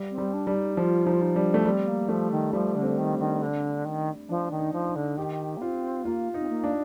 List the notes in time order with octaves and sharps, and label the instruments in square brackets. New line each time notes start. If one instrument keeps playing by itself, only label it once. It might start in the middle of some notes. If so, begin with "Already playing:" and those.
Already playing: [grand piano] G3
[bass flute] C4
[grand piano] G3
[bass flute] D4
[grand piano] G3
[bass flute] D#4
[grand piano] F3 [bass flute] F4
[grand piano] F3 [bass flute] D#4
[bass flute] F4
D#4
[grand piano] G3 [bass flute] D4
[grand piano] A3
[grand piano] G3 [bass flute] C4
[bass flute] A#3
[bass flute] F3 [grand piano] A3
[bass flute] D#3
[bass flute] F3 [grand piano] G3
[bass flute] D3
[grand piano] C4
[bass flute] D#3
[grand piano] D4
[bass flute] D#3
D3
D#3
[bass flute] F3 [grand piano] D4
[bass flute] D#3
[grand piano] D#4
[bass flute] F3
[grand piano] D#4
[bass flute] D3
[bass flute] D#3 [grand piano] G4
[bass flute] A#3
[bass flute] C4 [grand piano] F4
[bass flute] A#3 [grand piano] F4
[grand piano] D#4
[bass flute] C4
A#3
[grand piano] D4